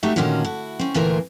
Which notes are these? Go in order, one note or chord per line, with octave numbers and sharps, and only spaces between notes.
A3 D#4 F#4 G4 E5
A#2 D3 D#3 C#4 F4 F#4
E4 F#4
C4 C#4
D2 A#2 E3 C4 F4 A#4